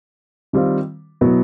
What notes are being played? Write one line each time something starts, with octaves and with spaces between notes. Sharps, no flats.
D#3 G3 C4 F4
B2 F#3 B3 E4